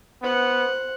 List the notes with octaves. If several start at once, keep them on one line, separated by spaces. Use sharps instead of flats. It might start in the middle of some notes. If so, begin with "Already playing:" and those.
B3 C5 F#5